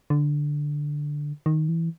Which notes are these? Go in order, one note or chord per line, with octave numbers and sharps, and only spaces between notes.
D3
D#3
E3